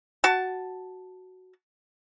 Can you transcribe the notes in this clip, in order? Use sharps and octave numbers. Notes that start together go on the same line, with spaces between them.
F#4 A5